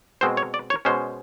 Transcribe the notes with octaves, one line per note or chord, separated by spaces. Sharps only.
B2 G#3 C4 C5
C#5
D5
C#5
B2 G#3 C#4 C5